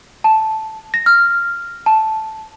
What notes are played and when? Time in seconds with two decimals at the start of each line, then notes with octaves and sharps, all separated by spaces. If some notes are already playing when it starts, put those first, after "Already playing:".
0.24 A5
0.94 A#6
1.06 F6
1.86 A5